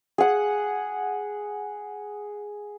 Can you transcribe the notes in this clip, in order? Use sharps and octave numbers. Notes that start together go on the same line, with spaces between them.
G#4 F#5